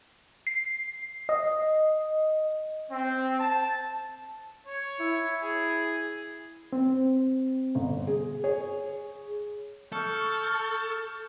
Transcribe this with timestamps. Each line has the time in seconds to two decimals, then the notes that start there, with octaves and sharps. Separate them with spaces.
0.47 C7
1.29 D#5
2.90 C4
3.40 A5
4.67 C#5
5.00 E4
5.43 G#4
6.73 C4
7.75 G1
8.07 G#4
8.44 G#4 C#5
9.92 A4 C#6 F6 G6